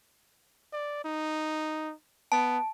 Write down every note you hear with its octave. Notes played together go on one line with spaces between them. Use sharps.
D5
D#4
B3 A5